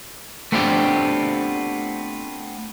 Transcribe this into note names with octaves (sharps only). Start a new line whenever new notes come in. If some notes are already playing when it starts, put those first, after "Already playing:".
A3 B3 C4 D4 F4 G4